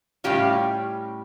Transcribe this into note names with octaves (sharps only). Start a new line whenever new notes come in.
A2 G3 C#4 F4 G4